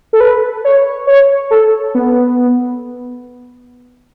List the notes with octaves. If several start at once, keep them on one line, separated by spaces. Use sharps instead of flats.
A4
B4
C#5
C#5
A4
B3